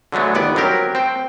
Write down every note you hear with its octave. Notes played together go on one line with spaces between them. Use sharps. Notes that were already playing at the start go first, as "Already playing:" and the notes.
D3 F#3 G#3 A3 B3
G1 D#2 B3 D5
F#3 C4 G4 A#4
C4 G5